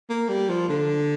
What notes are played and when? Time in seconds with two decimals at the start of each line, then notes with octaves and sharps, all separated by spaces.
0.10 A#3
0.29 G3
0.49 F3
0.69 D3